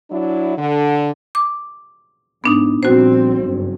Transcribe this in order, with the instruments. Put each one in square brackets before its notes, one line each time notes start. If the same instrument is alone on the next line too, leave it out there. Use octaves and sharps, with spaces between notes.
[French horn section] F#3 D4 E4
D3
[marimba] D6
[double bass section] G#2 [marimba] B3 D4 D#4
[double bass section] A#1 G3 C4 [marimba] F#4 C5
[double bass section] F#1 G2